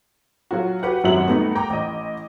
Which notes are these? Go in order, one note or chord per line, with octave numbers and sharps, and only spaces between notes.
F#3 F4 F#4
F#4 G4 B4 F#5
G#1 F#2 F#3 E5 F#5 F#7
G3 A3 B3 D#4
G5 A#5 D6
A1 D#5